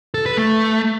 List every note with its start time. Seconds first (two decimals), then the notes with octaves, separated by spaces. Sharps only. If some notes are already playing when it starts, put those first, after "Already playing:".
0.14 A4
0.26 B4
0.37 A3